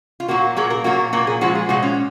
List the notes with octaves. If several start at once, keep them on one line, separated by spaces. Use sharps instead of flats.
F4
A#2 F#3 A#3 F#4
A#2 F#3 A#3 G#4
A#4
A#2 F#3 A#3 F#4
A#2 F#3 A#3 A#4
G#4
A#2 F3 G#3 F#4
G#4
A#2 F3 G#3 F#4
C#4